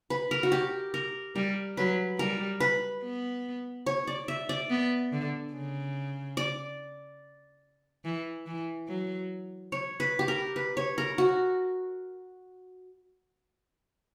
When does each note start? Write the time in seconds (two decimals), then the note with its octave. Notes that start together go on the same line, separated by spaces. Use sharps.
0.10 B4
0.31 A#4
0.43 F#4
0.52 G4
0.94 A#4
1.35 G3 A#4
1.77 F#3 B4
2.19 G3 A#4
2.60 B4
3.03 B3
3.86 C#5
4.07 D5
4.28 E5
4.49 D5
4.70 B3
5.13 D3
5.54 C#3
6.37 D5
8.05 E3
8.46 E3
8.88 F#3
9.72 C#5
10.00 B4
10.19 G4
10.28 A#4
10.56 B4
10.77 C#5
10.98 A#4
11.18 F#4